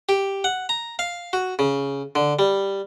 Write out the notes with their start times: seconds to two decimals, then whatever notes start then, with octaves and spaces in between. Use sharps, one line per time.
0.09 G4
0.44 F#5
0.69 A#5
0.99 F5
1.33 F#4
1.59 C#3
2.15 D3
2.39 G3